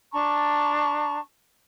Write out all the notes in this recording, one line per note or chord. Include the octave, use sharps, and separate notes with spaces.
D4 A5 A#5 C#6